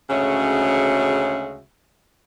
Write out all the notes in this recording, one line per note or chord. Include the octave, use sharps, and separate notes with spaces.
D2 C#3 G#3 C#4 F#4 E5